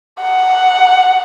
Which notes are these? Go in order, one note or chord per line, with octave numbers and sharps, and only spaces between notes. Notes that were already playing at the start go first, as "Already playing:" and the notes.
F#5